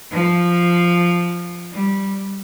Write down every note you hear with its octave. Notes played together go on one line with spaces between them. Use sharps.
F3
G3